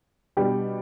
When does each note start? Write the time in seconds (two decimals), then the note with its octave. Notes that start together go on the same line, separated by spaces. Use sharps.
0.37 B2 G3 D4 G4 D5